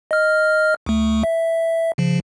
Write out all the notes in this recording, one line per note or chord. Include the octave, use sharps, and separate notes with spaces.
D#5 F6
D2 A3
E5
C#3 F3